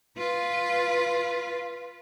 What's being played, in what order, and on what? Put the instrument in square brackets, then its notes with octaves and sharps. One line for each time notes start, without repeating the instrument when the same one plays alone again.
[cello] F4 B4